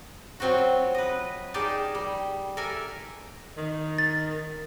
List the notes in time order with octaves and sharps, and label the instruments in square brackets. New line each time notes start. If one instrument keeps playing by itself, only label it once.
[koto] F#3 C4 F4 F#4
B4 D#5
D#4 G4 G#4 A#4 D5 A5
G3
A4 A#4 D5 E5 G#5
[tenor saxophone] D#3
[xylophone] A6